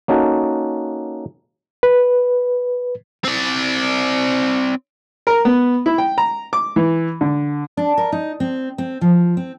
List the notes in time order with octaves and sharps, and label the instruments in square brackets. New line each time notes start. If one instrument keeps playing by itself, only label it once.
[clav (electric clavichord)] A#3 C#4 D#4 F#4 A4
[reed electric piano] B4
[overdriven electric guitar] C4 D5
[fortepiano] A#4
B3
E4
G5
A#5
D6
E3
D3
[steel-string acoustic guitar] D4
A#4
D#4
C4
C4
F3
C4